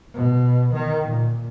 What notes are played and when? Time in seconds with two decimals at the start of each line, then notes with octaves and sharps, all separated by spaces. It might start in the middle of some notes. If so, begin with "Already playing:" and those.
0.14 B2
0.74 D#3
1.09 A#2